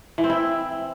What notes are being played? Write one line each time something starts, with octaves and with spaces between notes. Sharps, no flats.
E3
C4
E4